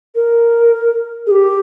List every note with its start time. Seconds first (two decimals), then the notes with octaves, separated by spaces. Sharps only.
0.15 A#4
1.27 G#4
1.31 G4